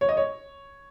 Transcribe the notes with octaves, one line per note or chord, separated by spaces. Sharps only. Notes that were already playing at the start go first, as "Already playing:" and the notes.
C#5
D#5
C#5